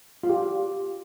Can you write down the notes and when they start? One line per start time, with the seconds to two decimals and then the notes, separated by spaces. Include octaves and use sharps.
0.23 F4
0.29 G4